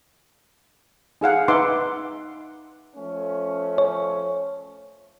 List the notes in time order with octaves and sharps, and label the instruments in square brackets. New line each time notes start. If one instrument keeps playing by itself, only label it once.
[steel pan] D#4 G#4 F5 F#5
D#4 B4 E5 F#5 C6 D6
[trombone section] F3 A3 C#4
[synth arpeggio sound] C#5